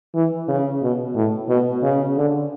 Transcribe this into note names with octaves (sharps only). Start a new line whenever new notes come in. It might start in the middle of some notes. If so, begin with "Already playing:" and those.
E3
C#3
B2
A2
B2
C#3
D3